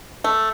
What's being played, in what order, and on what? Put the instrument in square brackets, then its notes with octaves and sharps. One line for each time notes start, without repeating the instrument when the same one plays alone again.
[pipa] A3